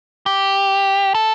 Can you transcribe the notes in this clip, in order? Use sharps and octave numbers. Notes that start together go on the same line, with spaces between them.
G4
A4